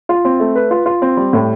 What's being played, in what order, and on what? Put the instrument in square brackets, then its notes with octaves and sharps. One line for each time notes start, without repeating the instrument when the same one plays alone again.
[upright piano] F4
C4
A3
B4
F4
F4
C4
G3
A2